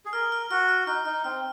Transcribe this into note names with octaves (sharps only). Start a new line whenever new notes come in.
G#4
A#4 F6
F6
F#4 F6
F6
D#4 F6
D#4 F6
C4 F6